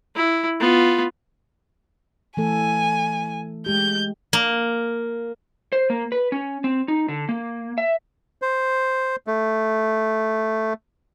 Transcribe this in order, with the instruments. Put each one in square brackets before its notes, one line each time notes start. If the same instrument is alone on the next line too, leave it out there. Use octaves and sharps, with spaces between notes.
[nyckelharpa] E4
B3 F4
[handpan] E3 A3 A4 [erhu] G#5
[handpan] G#3 G4 [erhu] G6
[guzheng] A#3
[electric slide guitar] C5
A#3
B4
C#4
C4
D#4
D3
A#3
E5
[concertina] C5
A3